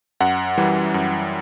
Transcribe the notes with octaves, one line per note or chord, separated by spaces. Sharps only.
F#2 F#5
E3 G3
F#2